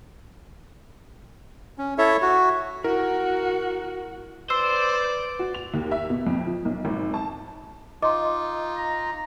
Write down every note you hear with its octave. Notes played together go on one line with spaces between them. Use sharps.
C#4
E4 A4 C#5 E5
F#4
E4 F#4 A#4
B4 C5 D5 E6
F#4
F7
D#2
E5
B2
F2
F3
B1
G#1
A5
D#4 F4 D#5 C6 D6
A#5